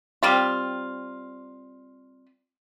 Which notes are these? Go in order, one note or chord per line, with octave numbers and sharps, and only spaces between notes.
G3 C4 F4